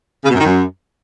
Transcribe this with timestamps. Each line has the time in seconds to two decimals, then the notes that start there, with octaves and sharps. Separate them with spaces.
0.24 C#3
0.30 B2
0.35 F#2
0.40 D#3
0.46 F#2